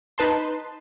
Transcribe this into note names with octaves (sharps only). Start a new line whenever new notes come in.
D#4 B4 A5 C6